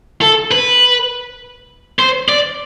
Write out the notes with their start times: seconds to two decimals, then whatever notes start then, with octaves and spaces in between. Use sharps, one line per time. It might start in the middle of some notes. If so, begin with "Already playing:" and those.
0.22 A4
0.51 B4
1.99 C5
2.29 D5